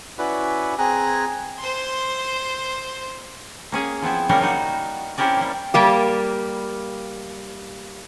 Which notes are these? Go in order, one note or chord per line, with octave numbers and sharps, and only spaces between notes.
C#4 E4 F#4 B4 D5 B5
C4 G#4 G#5 A#5 F#6
C5 C6
A#3 C#4 G#4
F3 B3 C4 E4
C#3 F#3 G3 A#3 F#4 A#4
G3 D#4 F#4
C4 C#4 E4 G4 A#4 D5
G3 A#3
G3 A#3 G4